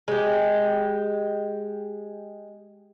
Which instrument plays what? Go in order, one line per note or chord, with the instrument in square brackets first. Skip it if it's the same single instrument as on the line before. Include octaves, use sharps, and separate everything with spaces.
[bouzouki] G#3 G4